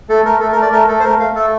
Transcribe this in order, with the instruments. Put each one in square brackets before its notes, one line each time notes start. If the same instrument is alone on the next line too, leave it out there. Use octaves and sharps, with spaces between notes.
[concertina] A3 A4
A3 A#4
A3 A4
A#4
A3
D5
A3 A#4
A3 A4
C5
A3 A#4
A3 F5
A3 A4